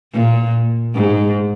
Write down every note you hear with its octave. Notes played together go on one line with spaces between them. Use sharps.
A#2
G#2